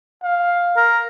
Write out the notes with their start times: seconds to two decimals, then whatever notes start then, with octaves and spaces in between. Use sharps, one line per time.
0.23 F5
0.77 A#4